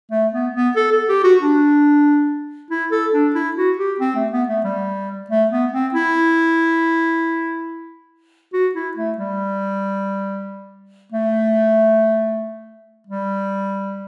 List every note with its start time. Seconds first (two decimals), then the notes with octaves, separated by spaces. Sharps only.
0.11 A3
0.33 B3
0.54 B3
0.76 A4
0.92 A4
1.09 G4
1.24 F#4
1.40 D4
2.70 E4
2.91 A4
3.13 D4
3.35 E4
3.56 F#4
3.78 G4
3.99 C4
4.15 A3
4.32 B3
4.48 A3
4.64 G3
5.29 A3
5.51 B3
5.73 C4
5.94 E4
8.53 F#4
8.75 E4
8.96 A3
9.18 G3
11.12 A3
13.06 G3